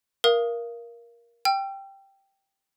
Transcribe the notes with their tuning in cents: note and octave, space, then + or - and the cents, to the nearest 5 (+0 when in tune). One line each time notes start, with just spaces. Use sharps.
A#4 +15 F5 -30 D#6 +0
G5 +0 E6 +45